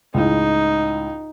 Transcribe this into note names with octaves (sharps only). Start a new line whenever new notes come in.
C#2 A2 D#4